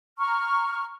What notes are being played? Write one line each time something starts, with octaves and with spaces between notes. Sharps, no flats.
A#5 C#6 F6